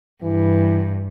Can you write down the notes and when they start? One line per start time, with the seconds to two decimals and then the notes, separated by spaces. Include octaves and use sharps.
0.22 G2 E3